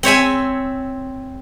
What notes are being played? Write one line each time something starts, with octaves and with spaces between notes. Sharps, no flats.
C4 C#5 E5 G#5